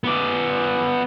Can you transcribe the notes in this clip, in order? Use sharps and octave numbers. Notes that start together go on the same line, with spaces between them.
B3 D5